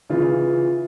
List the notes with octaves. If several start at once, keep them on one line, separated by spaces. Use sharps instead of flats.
C#3 E3 F4